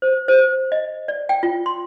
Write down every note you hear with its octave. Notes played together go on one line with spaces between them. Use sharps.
C5
C5
D#5
D5
G5
F4
C6